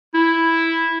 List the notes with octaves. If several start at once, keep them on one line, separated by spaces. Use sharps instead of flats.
E4